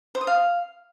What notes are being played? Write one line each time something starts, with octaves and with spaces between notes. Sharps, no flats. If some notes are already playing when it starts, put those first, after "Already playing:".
C5
D#6
F5